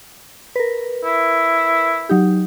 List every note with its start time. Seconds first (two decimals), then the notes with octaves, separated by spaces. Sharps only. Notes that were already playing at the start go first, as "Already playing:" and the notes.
0.56 A#4 B4
1.05 E4
2.09 F#3 D#4 G4